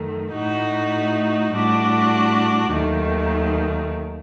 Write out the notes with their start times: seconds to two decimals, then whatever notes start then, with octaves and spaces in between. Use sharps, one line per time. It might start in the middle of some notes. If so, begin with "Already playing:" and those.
Already playing: F#2 D#3 A3
0.32 A2 A3 D#4 F#4
1.52 A2 G3 D4 F#4
2.72 D#2 D#3 F#3 A3